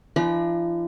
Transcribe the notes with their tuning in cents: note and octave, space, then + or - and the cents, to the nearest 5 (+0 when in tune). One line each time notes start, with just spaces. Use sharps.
F3 -45 D4 +45 B5 -35